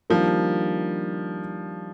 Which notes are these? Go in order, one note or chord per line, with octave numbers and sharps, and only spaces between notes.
D#3 F3 G3 A#3 D4